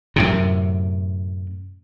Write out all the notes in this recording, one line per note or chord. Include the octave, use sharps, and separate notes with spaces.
F#2 A2 C3